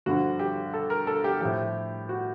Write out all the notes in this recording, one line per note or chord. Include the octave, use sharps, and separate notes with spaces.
G2 D3 F3 F#4
G4
A4
A#4
A4
G4
A2 F3 G4
F#4